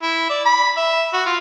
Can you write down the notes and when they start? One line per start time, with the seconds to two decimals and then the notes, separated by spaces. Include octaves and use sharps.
0.02 E4
0.30 D5
0.46 B5
0.77 E5
1.13 F#4
1.26 F4